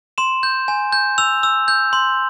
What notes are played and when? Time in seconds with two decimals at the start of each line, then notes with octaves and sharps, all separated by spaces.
0.18 C6 E7
0.43 G6
0.68 G#5
0.92 G6
1.18 E6 F7
1.43 E6
1.68 G6
1.93 C6